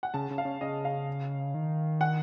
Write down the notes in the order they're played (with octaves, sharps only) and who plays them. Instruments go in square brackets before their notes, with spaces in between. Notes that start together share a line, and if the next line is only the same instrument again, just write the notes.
[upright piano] F#5
[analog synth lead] C#3 [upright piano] A5
[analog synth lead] C#3
[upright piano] F5
[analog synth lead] C#3
[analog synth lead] C#3 [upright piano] D#5
[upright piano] F5
[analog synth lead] D#3
[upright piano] F#5